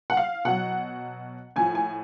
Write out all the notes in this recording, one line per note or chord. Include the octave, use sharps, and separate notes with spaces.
F#5
F5
B2 F#3 F#5
A2 F3 G#5
G#5